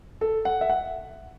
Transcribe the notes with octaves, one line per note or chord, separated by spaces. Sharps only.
A4
F#5
E5
F#5